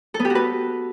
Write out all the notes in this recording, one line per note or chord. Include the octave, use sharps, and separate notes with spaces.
A4
B3
G4
F#4
B4